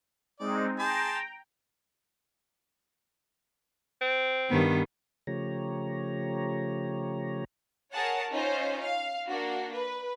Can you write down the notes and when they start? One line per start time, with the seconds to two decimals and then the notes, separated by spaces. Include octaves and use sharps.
0.39 G#3 C4 D#4 D5
0.79 G#4 G5 A5 A#5 C6
4.01 C4
4.50 G2 D#3 B3
5.27 C#3 F3 A3 G4 C#5 A#5
7.93 G#4 A#4 C#5 F#5 A5
8.31 C#4 D#4 F4 C5
8.83 F5
9.27 A#3 D4 F#4
9.73 B4